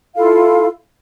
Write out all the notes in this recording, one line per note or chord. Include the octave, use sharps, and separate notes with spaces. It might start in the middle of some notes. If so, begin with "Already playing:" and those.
E4 F4 A4 F5